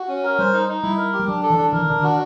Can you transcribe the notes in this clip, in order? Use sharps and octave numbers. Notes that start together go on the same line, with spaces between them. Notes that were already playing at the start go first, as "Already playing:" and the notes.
Already playing: F#4
C#4
A#4
G3 C5
D#4
D#4
G3 E4
A#4
G4
G3
F#3 D4
A4
E3
D4
E3 A#4
D#3
D3 D4
D#3 F#4